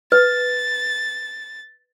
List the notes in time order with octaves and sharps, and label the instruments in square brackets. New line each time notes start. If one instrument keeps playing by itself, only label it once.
[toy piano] B4 [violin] A6